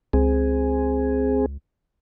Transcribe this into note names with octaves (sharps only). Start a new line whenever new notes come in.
C#2 C4 G#4